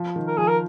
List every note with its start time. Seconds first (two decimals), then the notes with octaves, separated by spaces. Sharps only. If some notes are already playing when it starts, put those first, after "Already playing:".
Already playing: F3
0.16 D#3
0.27 A#4
0.37 F3 G#4
0.47 A#4